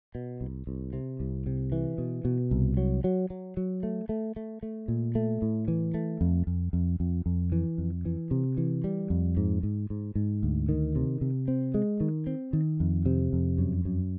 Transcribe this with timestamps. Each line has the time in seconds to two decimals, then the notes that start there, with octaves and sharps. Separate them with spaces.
0.15 B2
0.41 C2
0.67 C2
0.93 C3
1.20 C2
1.46 C3
1.72 E3
1.98 B2
2.25 B2
2.51 C2
2.77 F#3
3.04 F#3
3.30 F#3
3.57 F#3
3.83 A3
4.09 A3
4.36 A3
4.63 A3
4.88 A#2
5.15 A3
5.42 A2
5.68 E3
5.94 A3
6.21 F2
6.47 F2
6.73 F2
7.00 F2
7.26 F2
7.52 E3
7.78 F2
8.05 E3
8.31 C3
8.57 E3
8.84 G3
9.10 F2
9.37 G#2
9.63 G#2
9.90 G#2
10.15 G#2
10.43 D2
10.69 D#3
10.96 C3
11.21 C3
11.48 C4
11.74 G#3
12.00 D#3
12.27 C4
12.53 D#3
12.80 F2
13.06 C3
13.33 F2
13.58 F#2
13.85 F#2